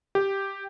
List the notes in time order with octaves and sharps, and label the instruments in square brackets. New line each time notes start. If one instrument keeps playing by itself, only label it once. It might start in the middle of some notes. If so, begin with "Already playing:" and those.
[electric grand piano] G4